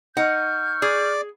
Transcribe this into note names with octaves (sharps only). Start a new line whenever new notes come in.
D#4 F#5 C#6 F6 G6
G#4 D5